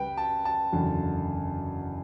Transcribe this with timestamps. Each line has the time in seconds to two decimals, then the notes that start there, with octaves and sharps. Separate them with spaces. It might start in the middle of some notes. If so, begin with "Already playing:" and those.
Already playing: C#2 C#3 G3 B4 G5
0.17 A5
0.45 A5
0.72 F#1 E2 D3 F#3